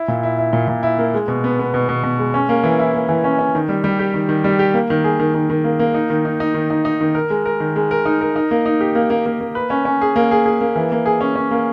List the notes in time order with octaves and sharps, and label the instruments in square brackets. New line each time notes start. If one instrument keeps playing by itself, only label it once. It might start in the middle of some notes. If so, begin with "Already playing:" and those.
Already playing: [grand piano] E4
A#2
E4
E4
A#2
A#2
E4
A#3
G#3
B2
B3
B3
B2
B2
B2
G#3
C#4
A#3
E3
E4
A#3
E3
C#4
C#4
D#3
G3
G3
G4
D#3
D#3
G3
G4
A#3
D#3
G#4
D#3
D#3
D#3
A#3
A#3
D#4
D#3
D#4
D#4
D#3
D#4
D#4
D#3
A#4
G#3
A#4
D#3
G#3
A#4
D#4
A#4
D#4
A#3
D#4
G4
A#3
A#3
A#3
A#3
B4
C#4
C#4
G#4
A#3
G#4
G#4
A#3
E3
A#3
G#4
C#4
C#4
A#3